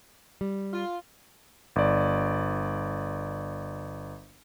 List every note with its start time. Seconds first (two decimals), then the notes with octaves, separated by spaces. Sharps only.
0.41 G3
0.72 F4
1.76 G1 D5